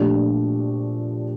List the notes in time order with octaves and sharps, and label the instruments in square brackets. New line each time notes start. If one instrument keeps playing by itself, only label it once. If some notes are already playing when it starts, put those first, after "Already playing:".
Already playing: [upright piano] A#2 F3 A3 D4 G4